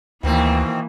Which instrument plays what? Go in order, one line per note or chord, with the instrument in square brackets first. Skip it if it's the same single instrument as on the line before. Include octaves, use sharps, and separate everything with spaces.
[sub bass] D2 [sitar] B2 D#3 C4 [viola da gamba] E3 A#3